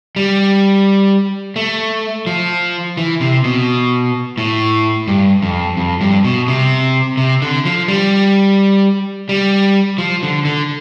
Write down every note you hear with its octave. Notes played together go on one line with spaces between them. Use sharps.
G3
A3
F3
E3
C3
B2
A2
G2
F2
F2
G2
B2
C3
C3
D3
F3
G3
G3
F3
D3
D3